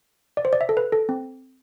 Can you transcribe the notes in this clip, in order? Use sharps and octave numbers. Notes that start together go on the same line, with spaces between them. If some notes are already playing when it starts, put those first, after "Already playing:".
D5
C5
D5
E5
A4
B4
A4
C4